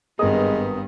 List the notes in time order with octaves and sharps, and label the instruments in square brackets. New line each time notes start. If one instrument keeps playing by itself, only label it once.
[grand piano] G#1 A#4 D#6 [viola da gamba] G2 B3 [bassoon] G#3